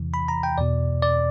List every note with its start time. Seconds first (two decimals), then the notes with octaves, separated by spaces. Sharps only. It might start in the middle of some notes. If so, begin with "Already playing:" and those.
Already playing: E2 C3 E3
0.14 B5
0.28 A#5
0.43 G5
0.58 E2 B2 D5
1.02 D5